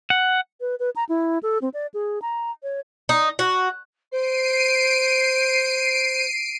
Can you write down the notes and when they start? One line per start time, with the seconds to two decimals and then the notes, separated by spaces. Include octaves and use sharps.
0.10 F#5
0.61 B4
0.80 B4
0.96 A#5
1.09 E4
1.43 A4
1.62 C4
1.74 D5
1.94 G#4
2.22 A#5
2.63 C#5
3.09 D#4
3.39 F#4
4.12 C5 C7 D7 D#7